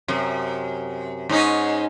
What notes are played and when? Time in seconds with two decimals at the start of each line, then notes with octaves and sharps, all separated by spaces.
0.08 F#2 C3
1.29 G#2 C#4 D#4